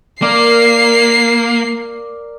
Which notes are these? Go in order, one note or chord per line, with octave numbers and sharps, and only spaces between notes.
A#3 A#4 D5 F5 C7